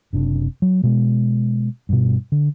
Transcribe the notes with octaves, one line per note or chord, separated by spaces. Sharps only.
F#1 C3 D4
F#3
B2 G#3
G2 B2
D3